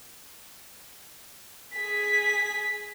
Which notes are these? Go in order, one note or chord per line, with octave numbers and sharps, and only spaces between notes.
G#4 B6